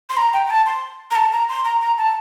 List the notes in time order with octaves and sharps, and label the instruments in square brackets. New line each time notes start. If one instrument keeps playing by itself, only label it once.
[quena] C6
A#5
G5
G5
A5
C6
A#5
A5
A#5
C6
A#5
A#5
A5